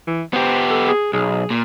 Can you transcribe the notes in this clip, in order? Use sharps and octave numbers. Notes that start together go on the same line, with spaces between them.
E3
B3 G4 C5
A4
G#4
B1 G#4
A#2